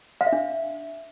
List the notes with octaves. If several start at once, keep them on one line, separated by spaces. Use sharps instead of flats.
F5
E5
D4